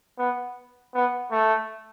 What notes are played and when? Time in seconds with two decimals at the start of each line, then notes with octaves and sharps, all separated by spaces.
0.19 B3
0.94 B3
1.32 A3